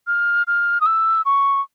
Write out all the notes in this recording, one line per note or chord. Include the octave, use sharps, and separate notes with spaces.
F6
F6
D#6
E6
C#6